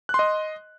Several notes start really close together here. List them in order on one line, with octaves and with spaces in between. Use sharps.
F#6 C6 D#5